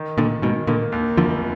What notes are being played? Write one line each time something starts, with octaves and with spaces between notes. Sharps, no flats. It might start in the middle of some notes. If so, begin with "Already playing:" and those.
Already playing: D#3
A#2 D3 D#3
G#2 B2 D#3
A#2 D3 A#3
D#2
F1 D3 F3